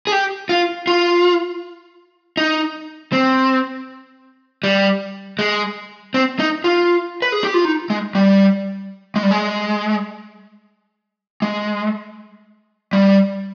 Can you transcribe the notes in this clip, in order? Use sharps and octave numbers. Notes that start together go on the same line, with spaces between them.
G#4
G4
F4
F4
D#4
C4
G3
G#3
C4
D#4
F4
B4
G#4
G4
F4
D#4
G#3
G3
G#3
G3
G#3
G#3
G3